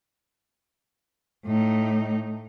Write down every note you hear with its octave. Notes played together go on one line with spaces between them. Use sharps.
A2 D#4